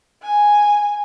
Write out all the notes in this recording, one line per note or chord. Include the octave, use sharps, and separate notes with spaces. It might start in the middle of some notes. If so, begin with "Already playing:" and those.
G#5